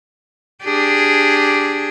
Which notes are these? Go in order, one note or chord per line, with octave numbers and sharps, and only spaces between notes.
D4 G4 G#4